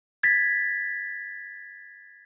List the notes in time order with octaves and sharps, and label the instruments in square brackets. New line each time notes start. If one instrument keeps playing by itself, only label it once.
[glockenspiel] G#6 A6 B6